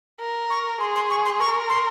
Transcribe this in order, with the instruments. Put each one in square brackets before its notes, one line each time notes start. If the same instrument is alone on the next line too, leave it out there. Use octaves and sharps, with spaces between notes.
[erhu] A#4
[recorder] C#6
[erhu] G#4 [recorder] C6
[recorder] C6
C#6
C6
[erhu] A#4 [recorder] C#6
[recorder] C6